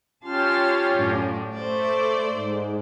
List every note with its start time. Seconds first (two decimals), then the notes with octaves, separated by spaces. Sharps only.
0.24 C#4 F4 G4 A5 C6 F6
0.93 F#2 A2 D4
1.54 A3 A4 C5 D5
2.32 G#2